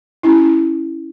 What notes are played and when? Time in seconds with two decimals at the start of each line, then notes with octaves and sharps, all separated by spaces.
0.23 C#4 E4